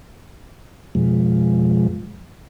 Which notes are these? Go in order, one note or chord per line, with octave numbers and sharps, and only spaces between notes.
F2 B2 F3 G#3